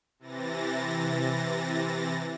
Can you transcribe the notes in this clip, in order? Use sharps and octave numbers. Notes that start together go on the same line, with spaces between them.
C3 E3 A6 A#6